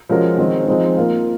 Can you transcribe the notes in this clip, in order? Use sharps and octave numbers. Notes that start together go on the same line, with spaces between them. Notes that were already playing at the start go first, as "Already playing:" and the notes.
F3 G#3 C#4 F#4 A#4
D#3 G#3 C4
F3 G#3 C4 D#4
A#3 F4 A#4 F5